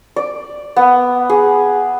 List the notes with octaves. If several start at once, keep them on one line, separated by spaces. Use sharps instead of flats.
D5
B3
G#4